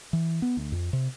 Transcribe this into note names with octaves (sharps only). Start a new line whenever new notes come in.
E3
B3
D2
F2
C3